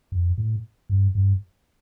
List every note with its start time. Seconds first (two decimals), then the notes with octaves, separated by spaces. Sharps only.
0.12 F2
0.38 A2
0.89 G2
1.15 G2